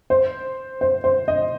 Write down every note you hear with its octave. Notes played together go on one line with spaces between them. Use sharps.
C5
C5
C5
D#5